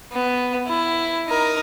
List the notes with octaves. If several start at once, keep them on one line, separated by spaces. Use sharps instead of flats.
B3
E4
D#4 A#4